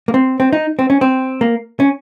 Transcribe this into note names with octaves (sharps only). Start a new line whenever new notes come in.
A#3
C4
C4
D#4
C4
C#4
C4
A#3
C#4